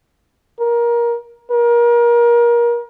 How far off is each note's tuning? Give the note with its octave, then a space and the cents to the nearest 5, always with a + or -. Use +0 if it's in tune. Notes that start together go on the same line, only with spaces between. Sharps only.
A#4 +20
A#4 +30